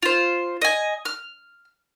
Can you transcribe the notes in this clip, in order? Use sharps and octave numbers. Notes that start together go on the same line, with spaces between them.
F4 C5
D#5 G#5
F6